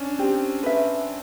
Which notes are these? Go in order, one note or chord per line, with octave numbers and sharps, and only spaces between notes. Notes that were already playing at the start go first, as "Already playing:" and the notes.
Already playing: C#4 D4
C4 G4
B4 E5